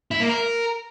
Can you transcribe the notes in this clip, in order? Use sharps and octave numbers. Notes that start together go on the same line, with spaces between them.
E4
A#3
A#4